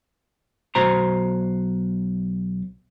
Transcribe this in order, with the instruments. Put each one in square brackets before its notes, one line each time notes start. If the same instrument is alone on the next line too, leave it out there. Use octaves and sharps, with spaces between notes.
[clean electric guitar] B1 F#4 C5 A#5